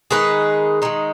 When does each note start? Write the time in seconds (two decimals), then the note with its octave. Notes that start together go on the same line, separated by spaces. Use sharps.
0.11 D#3 G#3 D#4 G#4 B4
0.82 D#3 G#3 D#4